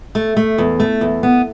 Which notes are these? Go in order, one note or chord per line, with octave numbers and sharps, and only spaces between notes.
A3
A3
E2
A3
E2
B3